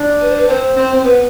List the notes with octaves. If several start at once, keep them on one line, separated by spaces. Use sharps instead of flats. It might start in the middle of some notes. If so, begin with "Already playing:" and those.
Already playing: D4
B4
C5
B4
C4 C5
C4
C4
B3 B4